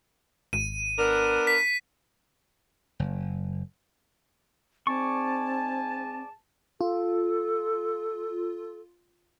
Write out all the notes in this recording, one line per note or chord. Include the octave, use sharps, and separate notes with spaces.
G#1 D#7
B3 D4 A#4
B6
F#1
G#2 C4 D5 G#5 A5 C#6
F4 A4